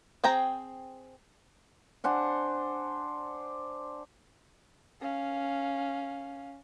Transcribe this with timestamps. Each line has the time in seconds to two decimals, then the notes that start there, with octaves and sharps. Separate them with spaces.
0.24 C4 G#4 G5 A#5
2.04 D4 C5 F#5 G#5
5.01 C#4 F5